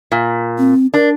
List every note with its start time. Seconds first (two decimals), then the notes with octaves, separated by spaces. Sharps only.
0.12 A#2
0.58 C4
0.94 D4 A#4